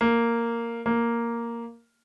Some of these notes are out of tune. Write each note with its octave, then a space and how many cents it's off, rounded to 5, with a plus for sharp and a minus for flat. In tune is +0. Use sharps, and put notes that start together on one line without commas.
A#3 -5
A#3 +0